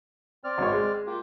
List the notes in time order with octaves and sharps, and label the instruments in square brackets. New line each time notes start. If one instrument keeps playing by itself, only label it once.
[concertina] C4 D5 F6
[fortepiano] G#1 C#5
G#3
[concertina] A#3 F4 G4